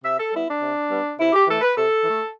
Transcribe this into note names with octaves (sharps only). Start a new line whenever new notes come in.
C3 E5
A4
G3 B3 E4
D4
C3
G3 B3
C3 E4
G4
E3 A3 A4
B4
C3 A4
E3 A3